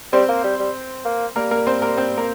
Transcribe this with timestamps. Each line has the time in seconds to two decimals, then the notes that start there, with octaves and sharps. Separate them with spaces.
0.13 G3 C4 C5
0.29 A#3
0.44 G3
0.59 G3
1.05 A#3
1.36 G3 A#3 A#4
1.51 A#3 A#4
1.67 C4 C5
1.82 A#3 A#4
1.97 C4 C5
2.17 A#3 A#4